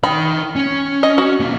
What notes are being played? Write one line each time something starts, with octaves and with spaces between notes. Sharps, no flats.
D#4 G5 B5
C#4
D#5
F#4
B1 A#3